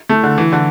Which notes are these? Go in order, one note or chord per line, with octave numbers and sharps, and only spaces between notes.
A3
D3
E3
D3